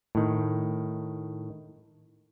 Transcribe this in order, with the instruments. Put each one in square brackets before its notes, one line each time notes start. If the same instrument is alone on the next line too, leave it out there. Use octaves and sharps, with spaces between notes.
[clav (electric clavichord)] A2 D#3